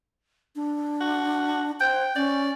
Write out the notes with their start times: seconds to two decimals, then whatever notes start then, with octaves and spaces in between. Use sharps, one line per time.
0.56 D4
1.01 F#4
1.80 C5 G5
2.16 C#4 D5